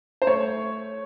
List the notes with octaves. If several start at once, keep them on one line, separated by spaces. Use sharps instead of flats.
C5
A3 C#5